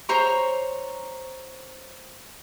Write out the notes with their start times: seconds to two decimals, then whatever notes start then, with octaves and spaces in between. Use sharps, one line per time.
0.09 C5 C#5 A#5 C#6